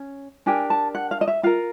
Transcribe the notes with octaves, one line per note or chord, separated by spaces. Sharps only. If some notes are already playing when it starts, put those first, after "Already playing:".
Already playing: C#4
D4 G4 A#4 G#5
A5
F#5
F5
D#5
E5
F4 A#4 F5